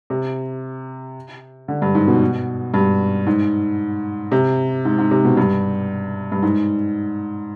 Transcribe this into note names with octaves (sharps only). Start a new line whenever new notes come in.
C3
D3
G2
G#2
B2
G2
G#2
C3
G#2
G#2
C3
B2
G2
G2
G#2